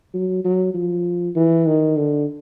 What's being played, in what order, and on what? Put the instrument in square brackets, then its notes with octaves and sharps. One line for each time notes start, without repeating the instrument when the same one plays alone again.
[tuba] F#3
F#3
F3
E3
D#3
D3